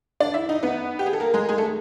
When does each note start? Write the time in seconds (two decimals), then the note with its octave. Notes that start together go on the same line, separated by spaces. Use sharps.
0.20 D4 D5
0.34 E4 E5
0.49 D#4 D#5
0.63 B3 B4
0.99 G4
1.06 G#4
1.13 A4
1.20 A#3 A#4
1.34 G#3 G#4
1.49 G#3 G#4
1.58 A3 A4